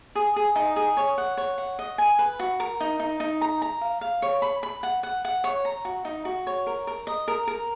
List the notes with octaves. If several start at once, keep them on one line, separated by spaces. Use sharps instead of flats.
G#4
G#4
D#4
G#4
C#5
F#5
C#5
F#5
D#5
G#5
B4
F#4
A#4
D#4
D#4
D#4
A#5
A#5
F5
F5
C#5
B5
B5
F#5
F#5
F#5
C#5
A#5
F#4
D#4
F#4
C#5
A#4
A#4
D#5
A#4
A#4